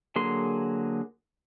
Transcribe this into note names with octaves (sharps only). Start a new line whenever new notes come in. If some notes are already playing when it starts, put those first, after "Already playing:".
D3 F#3 A#3 G#4 C6